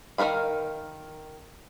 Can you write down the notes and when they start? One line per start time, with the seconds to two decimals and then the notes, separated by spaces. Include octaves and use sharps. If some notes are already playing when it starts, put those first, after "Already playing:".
0.18 D#3 A#3 A#4 F5 B5